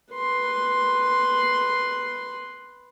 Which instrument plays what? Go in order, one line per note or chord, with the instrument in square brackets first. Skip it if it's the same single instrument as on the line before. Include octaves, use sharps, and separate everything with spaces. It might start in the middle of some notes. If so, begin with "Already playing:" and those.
[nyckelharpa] B4 C6